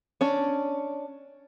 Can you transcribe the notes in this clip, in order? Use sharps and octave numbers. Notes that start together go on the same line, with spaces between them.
C#4 D4